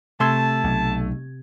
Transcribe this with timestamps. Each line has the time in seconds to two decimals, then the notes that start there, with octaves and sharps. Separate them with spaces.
0.20 C3 A3 A5 C6 E6 G#6
0.64 B1